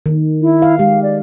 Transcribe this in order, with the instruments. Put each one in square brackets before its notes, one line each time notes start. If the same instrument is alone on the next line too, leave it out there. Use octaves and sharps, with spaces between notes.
[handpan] D#3
[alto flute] E4
[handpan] F5
[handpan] G#3 G4 [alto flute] F5
[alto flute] D5